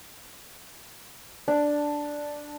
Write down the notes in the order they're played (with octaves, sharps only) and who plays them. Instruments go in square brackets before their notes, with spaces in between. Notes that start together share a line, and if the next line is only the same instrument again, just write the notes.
[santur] D4